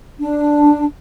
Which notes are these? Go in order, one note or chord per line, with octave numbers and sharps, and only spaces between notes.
D4